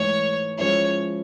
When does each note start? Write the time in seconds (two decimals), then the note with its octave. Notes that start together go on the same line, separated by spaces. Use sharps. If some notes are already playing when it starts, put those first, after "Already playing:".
Already playing: G#2 E3 A3 C#5
0.58 F3 G#3 C#4 E4 C#5